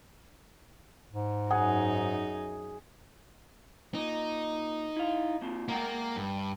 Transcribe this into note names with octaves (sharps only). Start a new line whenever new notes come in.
G#2
F#2 D#4 G#4 F#5
A#2 D#4
E4 F5
A#3 C4 F4
G#3 A#3 A#4 F#5 G5
G2